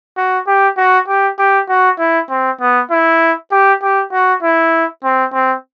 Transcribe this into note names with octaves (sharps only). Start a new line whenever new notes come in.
F#4
G4
F#4
G4
G4
F#4
E4
C4
B3
E4
G4
G4
F#4
E4
C4
C4